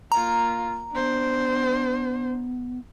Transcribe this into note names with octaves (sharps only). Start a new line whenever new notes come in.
A#3 F4 A#5
B3 D4 C5